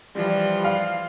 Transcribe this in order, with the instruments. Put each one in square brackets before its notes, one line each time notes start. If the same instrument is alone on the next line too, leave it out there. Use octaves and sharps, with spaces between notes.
[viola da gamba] E3 F3 F4 [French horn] G3
[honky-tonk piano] F5